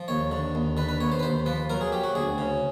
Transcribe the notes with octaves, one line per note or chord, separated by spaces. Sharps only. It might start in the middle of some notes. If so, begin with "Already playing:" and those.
Already playing: F3
D#2 C#5
D3
D#2
D3 B4
B4
D#2 C#5
C5
B4
D#2 C5
F3 B4
F#3 A#4
G#4
F#3 G4
F#4
D2 G#4
C#3